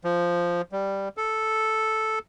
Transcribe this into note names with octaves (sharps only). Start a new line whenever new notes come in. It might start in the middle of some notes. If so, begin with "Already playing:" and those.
F3
G3
A4